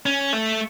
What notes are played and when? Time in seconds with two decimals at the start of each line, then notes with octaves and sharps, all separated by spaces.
0.06 C#4
0.33 A3